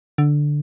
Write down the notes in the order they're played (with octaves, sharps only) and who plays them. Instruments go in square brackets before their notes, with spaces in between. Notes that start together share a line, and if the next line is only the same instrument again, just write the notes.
[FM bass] D3